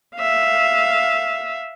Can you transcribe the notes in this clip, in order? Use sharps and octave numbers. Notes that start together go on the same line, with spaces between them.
E5 F5